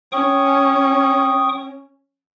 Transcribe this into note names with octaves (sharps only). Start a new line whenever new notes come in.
C#4 G5 C#6 D#6